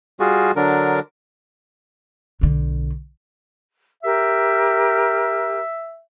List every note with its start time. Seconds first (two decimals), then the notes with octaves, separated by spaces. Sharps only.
0.20 G3 F4 F#4 G#4
0.56 D3 F#3 D4 A#4
2.41 B1 D3
4.03 G4 A#4 E5